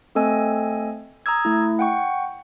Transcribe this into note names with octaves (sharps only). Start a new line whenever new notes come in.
A3 C4 A4 D#5 G#5 E6
A#5 D#6 E6 G#6
A3 E4
F#5 G5 C#6